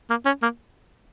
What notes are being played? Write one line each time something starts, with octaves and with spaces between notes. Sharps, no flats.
A#3
C#4
A#3